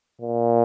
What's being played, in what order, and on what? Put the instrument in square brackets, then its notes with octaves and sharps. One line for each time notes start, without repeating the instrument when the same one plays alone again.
[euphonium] A#2